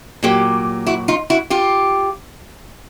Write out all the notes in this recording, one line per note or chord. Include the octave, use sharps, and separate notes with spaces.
A#2 F#3 A#3 G4
E4 F#4
D#4 F4
E4 F#4
F4 G4